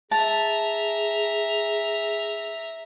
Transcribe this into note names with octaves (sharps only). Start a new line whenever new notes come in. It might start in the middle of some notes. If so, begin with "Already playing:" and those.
G#4 E5 A5 A#5